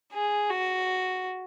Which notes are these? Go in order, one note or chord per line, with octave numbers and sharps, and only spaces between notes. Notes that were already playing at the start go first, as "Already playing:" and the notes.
G#4
F#4